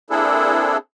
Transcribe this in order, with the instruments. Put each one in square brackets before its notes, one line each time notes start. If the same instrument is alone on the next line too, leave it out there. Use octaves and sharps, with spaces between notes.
[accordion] A#3 C4 D4 E4 G#4 A4